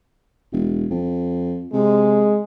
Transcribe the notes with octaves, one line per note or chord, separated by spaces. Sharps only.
E1
F2
C3 G#3